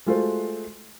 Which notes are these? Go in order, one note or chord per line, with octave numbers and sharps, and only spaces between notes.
G#3 A3 F4 F#4 A4 C5